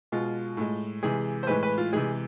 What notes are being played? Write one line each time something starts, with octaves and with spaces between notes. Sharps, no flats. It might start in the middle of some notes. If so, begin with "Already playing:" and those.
B2 G#3 F4
A2 G#3
C3 E3 G#3 G#4
C5
A2 E3 G#3 B4
B4
F4
C3 E3 G#3 G#4